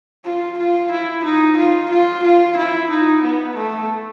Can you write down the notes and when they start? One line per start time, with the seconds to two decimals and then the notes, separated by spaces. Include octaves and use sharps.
0.24 F4
0.58 F4
0.92 E4
1.24 D#4
1.58 F4
1.91 F4
2.23 F4
2.57 E4
2.90 D#4
3.23 B3
3.56 A3